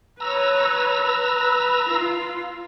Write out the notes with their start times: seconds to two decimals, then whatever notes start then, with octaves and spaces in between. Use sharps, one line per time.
0.20 B4 C#5 A#5 E6
1.01 B4
1.89 F4 F5